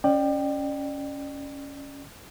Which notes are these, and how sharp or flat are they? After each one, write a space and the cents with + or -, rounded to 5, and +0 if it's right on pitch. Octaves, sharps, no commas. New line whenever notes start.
C#4 +5 D5 +35 G5 +0